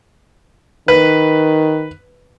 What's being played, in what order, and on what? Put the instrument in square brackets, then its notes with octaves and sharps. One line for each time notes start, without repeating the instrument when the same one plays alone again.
[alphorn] D#3 [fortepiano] B4